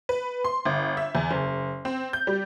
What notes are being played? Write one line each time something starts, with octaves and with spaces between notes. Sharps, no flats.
B4
C6
G1
E5
E2
F#1
C4
G6
G3